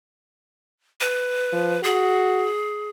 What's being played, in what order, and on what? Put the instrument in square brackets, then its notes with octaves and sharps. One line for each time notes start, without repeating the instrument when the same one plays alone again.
[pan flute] B4
[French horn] F3
[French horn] F#4 [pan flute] G#4